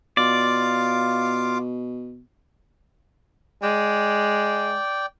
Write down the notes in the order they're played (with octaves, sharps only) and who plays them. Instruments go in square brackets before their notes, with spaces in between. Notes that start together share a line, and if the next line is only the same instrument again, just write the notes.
[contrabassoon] B2 [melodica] F4 F5 D6 [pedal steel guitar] D5
[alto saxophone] G#3 [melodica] D5 G5